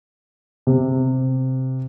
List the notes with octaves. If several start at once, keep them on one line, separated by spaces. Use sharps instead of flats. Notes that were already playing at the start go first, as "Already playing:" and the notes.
C3